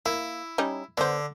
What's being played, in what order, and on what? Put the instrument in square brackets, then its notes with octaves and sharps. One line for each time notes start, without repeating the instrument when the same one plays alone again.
[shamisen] A#3 [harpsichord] E4
[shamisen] G3 C#4 D#4
[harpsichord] D3 [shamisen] B3 C5